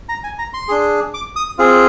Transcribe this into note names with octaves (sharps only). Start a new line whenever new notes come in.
A#5
G#5
A#5
C6
D4 G#4
D6
D#6
C4 F4 G#4